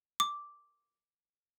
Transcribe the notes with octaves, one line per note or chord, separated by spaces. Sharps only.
D6